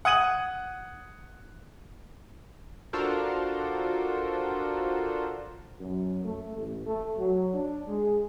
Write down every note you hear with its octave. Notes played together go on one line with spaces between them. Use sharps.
F#5 D#6 G#6 D#7 F#7
D4 F4 F#4 A4 A#4 C5
F#2
A3
A1
A3
F#3
D4
G#3